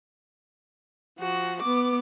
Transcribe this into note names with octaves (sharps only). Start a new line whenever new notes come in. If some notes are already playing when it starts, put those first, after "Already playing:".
F3 F#4
B3 D6